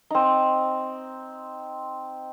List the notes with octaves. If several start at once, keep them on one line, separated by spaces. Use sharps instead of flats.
C4 D#4